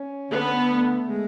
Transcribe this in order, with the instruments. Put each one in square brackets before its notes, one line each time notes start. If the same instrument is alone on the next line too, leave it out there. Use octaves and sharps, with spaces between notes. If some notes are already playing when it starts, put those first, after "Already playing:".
Already playing: [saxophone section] C#4
[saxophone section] D3 [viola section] B3
[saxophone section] A3
G#3